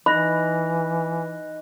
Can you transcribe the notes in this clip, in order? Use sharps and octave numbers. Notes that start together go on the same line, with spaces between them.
E3 D#4 B5 F#6 A#6